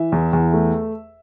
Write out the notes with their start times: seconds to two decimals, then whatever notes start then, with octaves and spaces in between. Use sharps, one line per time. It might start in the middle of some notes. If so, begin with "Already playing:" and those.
Already playing: E3 E5
0.12 E2
0.33 E2
0.53 A3